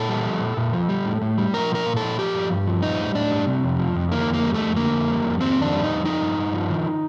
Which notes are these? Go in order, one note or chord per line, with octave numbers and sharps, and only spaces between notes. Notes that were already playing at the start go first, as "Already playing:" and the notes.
Already playing: A#2 A4
G3
F3
A#2
A#2
F3
G3
A2
A2
G3
F3 A#4
A#2 A#4
A#2
A4
F3
F3 G4
G2
G2
F3
G3 D#4
A2
A2 D4
G3
C3
F2
F3
F2
D#3 A#3
F2
A#3
G3
A3
F2
D3 A#3
F2
G3
F2
D#3 C4
F2 D4
G3
D#4
F2
F3 D#4
G2
G2
F3
D#3